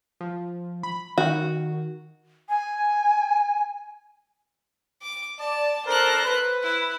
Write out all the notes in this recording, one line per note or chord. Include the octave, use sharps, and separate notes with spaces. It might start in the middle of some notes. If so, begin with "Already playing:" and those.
F3
B5
D#3 F#4
G#5
D6
D5 A5
D4 A4 A#4 C5 F#6
B4
E4